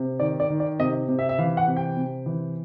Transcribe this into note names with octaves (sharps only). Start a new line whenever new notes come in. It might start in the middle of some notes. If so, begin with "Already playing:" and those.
Already playing: C3
D#3 D5
D5
D#3
D5
C3 D#5
C3
E5
E5
E3 F5
F#5
C3
G5
C3
E3